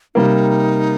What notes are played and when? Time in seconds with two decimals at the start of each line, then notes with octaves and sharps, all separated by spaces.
0.15 C3 G3 A#3 D#4